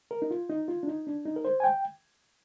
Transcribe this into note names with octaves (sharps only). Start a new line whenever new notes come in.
A#4
D#4
F4
D#4
F4
D4
D#4
D4
D#4
A#4
C5
G#5
G5